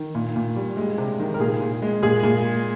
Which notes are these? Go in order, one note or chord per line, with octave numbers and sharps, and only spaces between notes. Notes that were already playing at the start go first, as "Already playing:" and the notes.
Already playing: D#3
A#2
A#2
G3
G#3
C3
D#3
A#4
A#2 G#4
A#2
G#3
A#2 G#4
A#2